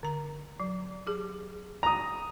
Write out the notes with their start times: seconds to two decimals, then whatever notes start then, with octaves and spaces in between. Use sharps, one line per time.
0.03 D3 A#5
0.60 F#3
1.07 G4 G#4
1.83 A#5 D#6